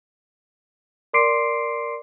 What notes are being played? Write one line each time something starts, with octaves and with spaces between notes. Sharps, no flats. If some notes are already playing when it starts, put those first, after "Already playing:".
A#4 D5 C6 D6 C7 D7